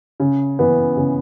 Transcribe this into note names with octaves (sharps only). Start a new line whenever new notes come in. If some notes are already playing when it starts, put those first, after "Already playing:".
C#3
E3 B3
C#3